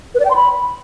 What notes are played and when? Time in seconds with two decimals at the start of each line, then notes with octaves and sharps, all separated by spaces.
0.15 B4
0.20 D5
0.25 G5
0.30 C6
0.36 B5